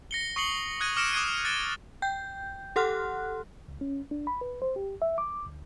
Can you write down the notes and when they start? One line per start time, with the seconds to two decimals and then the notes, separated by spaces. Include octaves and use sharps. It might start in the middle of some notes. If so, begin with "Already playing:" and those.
0.11 A#6 C#7 G7
0.36 C#6 D#6 C7 C#7 F#7 G7
0.80 D#6 F#6 G#6 A#6 D#7
0.96 D6 F6 A#6 C#7 D7 E7
1.13 D6 D#6 F#6 G#6 C7 D#7
1.44 F#6 A6 D7 G7
2.02 G5 G6
2.76 G4 A4 F#5 C6 F6 F#6
3.68 C#2
3.81 C#4
4.11 D4
4.27 B5
4.41 B4
4.62 C5
4.76 G4
5.02 E5
5.18 D6
5.46 D2